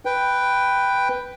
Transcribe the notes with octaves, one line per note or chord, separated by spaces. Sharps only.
B4 G5